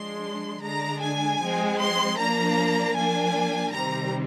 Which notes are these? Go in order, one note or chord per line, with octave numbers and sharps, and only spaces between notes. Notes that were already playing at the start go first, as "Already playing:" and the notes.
Already playing: F3 G#3 D4 C6
D3 G#3 D4 A#5
G#5
F3 G#3 C4
C6
F3 A#3 D4 A#5
F3 A#3 D4 G#5
C3 D#3 G3 C4 A#5